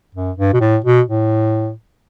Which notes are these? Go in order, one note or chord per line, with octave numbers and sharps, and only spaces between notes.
F#2
G2
B2
A2
B2
A2